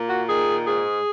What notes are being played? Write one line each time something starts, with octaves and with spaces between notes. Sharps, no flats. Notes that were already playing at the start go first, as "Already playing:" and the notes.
Already playing: A#2 A#3
F#4
D#3 G#4
G#2 G#4